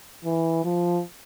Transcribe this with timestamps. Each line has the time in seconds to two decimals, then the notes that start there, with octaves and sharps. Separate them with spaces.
0.24 E3
0.64 F3